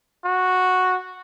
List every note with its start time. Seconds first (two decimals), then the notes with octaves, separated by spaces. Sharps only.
0.25 F#4